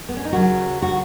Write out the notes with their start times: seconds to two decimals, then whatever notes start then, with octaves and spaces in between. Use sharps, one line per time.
0.09 B3
0.17 C#4
0.25 D#4
0.33 D#2 C#3 F#3 F#4
0.82 F#4